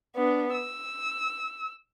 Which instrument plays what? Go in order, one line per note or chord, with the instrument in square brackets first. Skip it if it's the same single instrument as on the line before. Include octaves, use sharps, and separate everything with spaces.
[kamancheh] B3 D4
E6